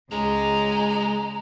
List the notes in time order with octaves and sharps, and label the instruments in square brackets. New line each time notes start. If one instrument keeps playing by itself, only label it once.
[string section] C#2 [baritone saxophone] G#3 [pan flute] A#5